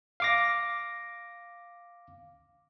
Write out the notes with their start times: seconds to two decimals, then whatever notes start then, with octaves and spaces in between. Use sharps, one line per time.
0.20 F5 D6 A#6